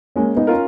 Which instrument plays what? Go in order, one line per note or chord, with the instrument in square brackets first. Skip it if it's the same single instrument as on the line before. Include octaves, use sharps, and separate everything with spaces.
[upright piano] G#3 [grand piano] A#3 C#4
[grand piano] B3 D#4
[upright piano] C#4 F4 A#4